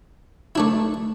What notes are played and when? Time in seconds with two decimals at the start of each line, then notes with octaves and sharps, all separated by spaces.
0.55 A3 D4 E4